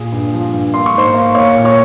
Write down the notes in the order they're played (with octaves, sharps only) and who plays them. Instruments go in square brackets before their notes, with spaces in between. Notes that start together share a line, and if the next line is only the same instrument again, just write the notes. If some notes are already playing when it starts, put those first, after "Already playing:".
Already playing: [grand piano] A#2 G#4
G2
F3
G2
A#3 C6
C#6
G#2 C5 C6
A#3
A#3 C#5 C#6
A#2
C#5 C#6